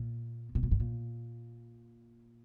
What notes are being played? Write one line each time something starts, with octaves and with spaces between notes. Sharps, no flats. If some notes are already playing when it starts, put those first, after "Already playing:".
Already playing: A#2
B2
A#2
G#2
A#2